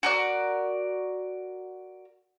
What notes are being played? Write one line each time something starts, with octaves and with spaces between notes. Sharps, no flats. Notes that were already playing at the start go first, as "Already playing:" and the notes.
F#4 A#4 D5